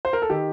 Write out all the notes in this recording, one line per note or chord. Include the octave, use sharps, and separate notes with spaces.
C5
A#4
A4
D#3 G4